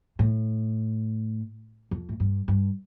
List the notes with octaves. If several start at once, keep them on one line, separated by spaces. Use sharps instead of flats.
A2
F2
A2
G2
G2